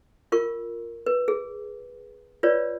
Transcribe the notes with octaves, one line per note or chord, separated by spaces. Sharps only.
F4 A#4 C#6
B4
G#4
F4 B4 C#5 D5